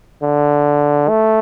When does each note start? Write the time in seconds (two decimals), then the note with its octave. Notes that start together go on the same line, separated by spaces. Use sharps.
0.23 D3
1.09 A3